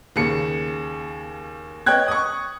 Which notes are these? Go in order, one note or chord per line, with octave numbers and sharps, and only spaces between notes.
D#2 C#3 C#7
C#5 D#5 G5 F#6 G#6
C#6 D#6